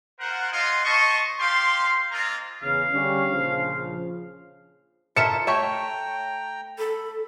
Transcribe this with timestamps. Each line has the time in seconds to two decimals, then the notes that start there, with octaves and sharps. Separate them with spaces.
0.20 F4 A#4 C5 F#5
0.52 F4 D#5 F5 F#5 G#5 C6
0.84 D#4 C5 D#5 A5 C#6
1.39 G3 G4 F5 G5 C6
2.11 G#3 A#3 C4 F4 A#4 A#5
2.63 E2 C#3 F5
2.93 D3 G3 C#4
3.33 A#1 C#3 F3
5.17 E4 F4 A4 A#4 E5 C#7 E7
5.47 A3 C#5 E5 G5 A#5
6.78 A4 B5